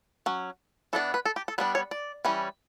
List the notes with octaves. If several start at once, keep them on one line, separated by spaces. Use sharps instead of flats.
F#3 C#4
E3 B3 D4 A4
B4
A4
G4
A4
G3 B3 D4 B4
C#5
D5
E3 G3 C#4